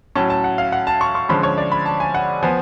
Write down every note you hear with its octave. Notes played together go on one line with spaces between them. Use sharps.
A2 F#3 C#4 A5
A5
F#5
F5
F#5
A5
C#6
C#6
D3 F3 G#3 C#4 B5
C#5
D5
B5
A5
G#5
F#5
F3 B3 G#5